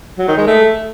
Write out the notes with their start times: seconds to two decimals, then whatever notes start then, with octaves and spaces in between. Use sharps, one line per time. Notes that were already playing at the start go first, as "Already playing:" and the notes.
0.18 F#3
0.28 D#3
0.37 G#3
0.47 A3